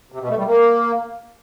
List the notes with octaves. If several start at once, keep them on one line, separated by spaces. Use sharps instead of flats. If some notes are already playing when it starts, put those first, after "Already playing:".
C3
B2
A3
G3
A#3